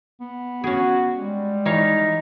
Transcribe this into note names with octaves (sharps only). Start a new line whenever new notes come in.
B3
C#4 F#4 G#4
G3 G#3
E3 D#4 C#5 F5